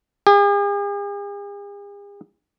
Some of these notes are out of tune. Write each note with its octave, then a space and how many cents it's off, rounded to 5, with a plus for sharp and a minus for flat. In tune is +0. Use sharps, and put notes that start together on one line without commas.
G#4 -45